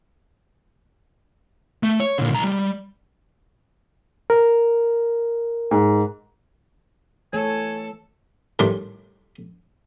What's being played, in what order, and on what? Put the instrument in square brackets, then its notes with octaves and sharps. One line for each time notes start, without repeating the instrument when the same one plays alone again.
[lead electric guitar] A3
C#5
A#2 D3
C2 A#5
G3
[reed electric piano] A#4
[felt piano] G#2
[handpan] E3 A3 C#5 [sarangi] A4 [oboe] G#5
[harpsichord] A2 D#3 G3 C6